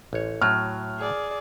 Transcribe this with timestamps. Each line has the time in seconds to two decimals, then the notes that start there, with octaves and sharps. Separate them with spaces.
0.13 A1 C#5
0.42 A2 F#3 F6
0.98 G#4 D5